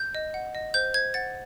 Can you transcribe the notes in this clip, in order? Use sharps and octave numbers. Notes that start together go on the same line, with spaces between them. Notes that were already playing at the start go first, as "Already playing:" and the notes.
Already playing: G6
D#5
F#5
D#5
C5 G6
C5 G#6
F#5 A6